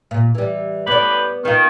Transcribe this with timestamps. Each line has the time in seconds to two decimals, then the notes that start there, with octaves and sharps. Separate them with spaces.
0.11 A#2
0.35 E3 G3
0.87 A2 B3 G4 B4 D5
1.45 D#3 B3 F4